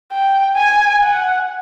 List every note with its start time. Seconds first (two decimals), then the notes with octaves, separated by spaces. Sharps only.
0.12 G5
0.57 G#5
1.02 F#5